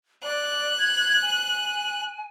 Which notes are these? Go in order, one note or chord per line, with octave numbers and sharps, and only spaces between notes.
D5 F#6
G#6
G#5